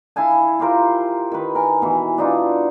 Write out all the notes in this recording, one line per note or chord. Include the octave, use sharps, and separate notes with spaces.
E4 F5 G#5 A5
F4 G4 A#4 C5
D#3 B4
A#4 G#5
B2 E3
D4 D#4 F4